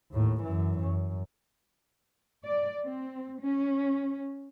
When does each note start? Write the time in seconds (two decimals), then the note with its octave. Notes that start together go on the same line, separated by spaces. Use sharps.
0.11 D#2 A2
0.43 F#2 E3
0.79 F#2
2.44 D5
2.84 C4
3.40 C#4